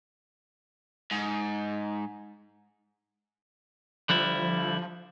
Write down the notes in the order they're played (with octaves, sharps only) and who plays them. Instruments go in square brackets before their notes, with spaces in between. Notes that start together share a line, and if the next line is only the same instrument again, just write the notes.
[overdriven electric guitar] G#2
[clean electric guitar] D3 G3 E4 [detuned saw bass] F3